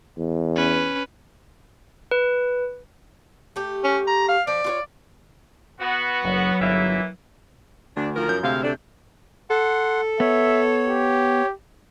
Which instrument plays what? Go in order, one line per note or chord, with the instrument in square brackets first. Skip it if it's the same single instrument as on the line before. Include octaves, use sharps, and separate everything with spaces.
[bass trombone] E2
[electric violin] C#4 B4
[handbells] B4
[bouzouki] A3 G4
[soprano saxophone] C#4
A#5
F5
[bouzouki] F3 [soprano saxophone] D5
[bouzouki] F4 F#4 C#5
[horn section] B3 F#4
[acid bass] F#1 [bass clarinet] F#3
[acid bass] G1 [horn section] E3 A#3 E5
[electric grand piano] D2 [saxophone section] D4
[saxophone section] D#3 F3 A#4
[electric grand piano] F#2 G6
[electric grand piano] D2 C3 [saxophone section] G#3 E5 F5
[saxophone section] A3 D4
[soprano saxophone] A4 [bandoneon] F#5 C6
[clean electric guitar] B3 [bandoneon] C#5 [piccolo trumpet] E5
[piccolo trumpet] G4